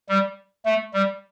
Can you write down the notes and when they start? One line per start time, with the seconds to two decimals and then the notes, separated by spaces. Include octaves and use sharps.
0.09 G3
0.65 A3
0.94 G3